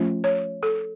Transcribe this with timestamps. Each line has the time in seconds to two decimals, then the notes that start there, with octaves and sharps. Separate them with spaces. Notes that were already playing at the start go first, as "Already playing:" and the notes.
Already playing: F3 A3 C#4 F4
0.24 C#5
0.63 A4